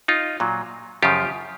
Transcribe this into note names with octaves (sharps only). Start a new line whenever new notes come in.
D#4 F4
A#2 F#3
F#2 C#3 F3 F4 G4